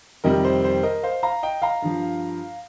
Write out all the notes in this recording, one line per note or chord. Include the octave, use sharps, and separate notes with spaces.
F2 C3 D#3 G3 A#4 D#5
C5
C5
A#4 D#5
C5 F5
F5 A#5
D#5 G5
F5 A#5
G2 F3